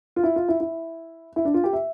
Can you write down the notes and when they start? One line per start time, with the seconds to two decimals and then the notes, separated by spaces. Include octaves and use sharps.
0.16 F4
0.24 E4
0.36 F4
0.49 E4
0.60 E4
1.36 E4
1.45 D4
1.54 F4
1.64 G4
1.73 E5